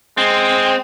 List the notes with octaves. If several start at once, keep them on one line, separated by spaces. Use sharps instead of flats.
G#3 C4